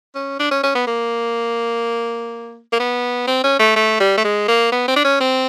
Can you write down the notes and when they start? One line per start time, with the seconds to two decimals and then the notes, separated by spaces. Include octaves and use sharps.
0.15 C#4
0.40 D4
0.51 C#4
0.63 C#4
0.75 B3
0.87 A#3
2.73 A#3
2.80 B3
3.27 C4
3.44 C#4
3.59 A3
3.76 A3
4.00 G3
4.17 A3
4.24 G#3
4.48 A#3
4.72 B3
4.88 C4
4.96 D4
5.04 C#4
5.20 C4